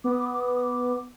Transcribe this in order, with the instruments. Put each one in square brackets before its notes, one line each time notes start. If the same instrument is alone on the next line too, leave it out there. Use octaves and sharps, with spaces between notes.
[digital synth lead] B3 [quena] D6
[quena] D#6
D6
D#6
D6
D#6
D6
D#6
D6